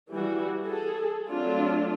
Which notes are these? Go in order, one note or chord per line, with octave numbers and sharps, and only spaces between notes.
E3 G3 F#4
G#4 A4
F#3 A3 C4 D4 F4